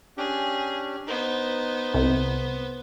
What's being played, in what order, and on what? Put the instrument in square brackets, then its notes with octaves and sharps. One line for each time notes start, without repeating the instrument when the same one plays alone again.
[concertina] C#4 D4 G4 [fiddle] G#4
[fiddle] B3 C5 [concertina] D#4
[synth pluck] C2